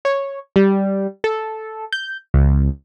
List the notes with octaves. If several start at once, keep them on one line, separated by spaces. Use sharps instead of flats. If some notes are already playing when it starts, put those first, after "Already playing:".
C#5
G3
A4
G6
C#2